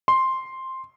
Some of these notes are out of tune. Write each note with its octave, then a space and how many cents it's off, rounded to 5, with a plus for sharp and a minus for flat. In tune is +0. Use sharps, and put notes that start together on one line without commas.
C6 +5